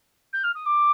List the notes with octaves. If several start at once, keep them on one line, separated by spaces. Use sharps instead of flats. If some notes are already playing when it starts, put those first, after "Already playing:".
G6
F6
D#6
D6